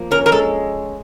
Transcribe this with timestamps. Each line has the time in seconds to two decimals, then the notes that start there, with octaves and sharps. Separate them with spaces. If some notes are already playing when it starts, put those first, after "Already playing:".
Already playing: F3 A#3
0.11 C#4 A#4
0.26 A#4
0.32 G#3 A4